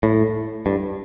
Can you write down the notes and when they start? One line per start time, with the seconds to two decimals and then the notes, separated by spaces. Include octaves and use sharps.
0.03 A2
0.66 G2